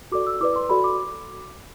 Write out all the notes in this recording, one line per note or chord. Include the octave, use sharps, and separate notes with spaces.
F#4 A4 D5 D6
E6
E4 B4 D5 D6
C6
F#4 A4 D5 B5
D6